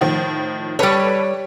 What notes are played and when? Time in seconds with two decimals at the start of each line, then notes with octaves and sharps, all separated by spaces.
0.01 A2 D#3 F3
0.79 G3 A4 B4 C#5 B5